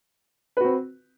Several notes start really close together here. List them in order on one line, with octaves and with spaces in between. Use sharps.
B4 F#4 C4